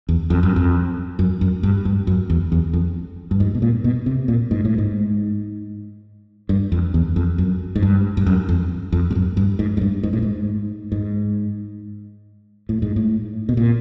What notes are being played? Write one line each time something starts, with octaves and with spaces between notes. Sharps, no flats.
E2
F2
F#2
F2
F#2
F#2
G2
G2
F#2
E2
E2
F2
G2
G#2
B2
A#2
B2
C3
A#2
G#2
A2
G#2
G2
F2
E2
F2
F#2
G#2
G2
G2
F#2
F2
F2
G2
F#2
G2
G#2
G#2
G2
G#2
A2
G#2
G#2
A2
G#2
A2
B2
A#2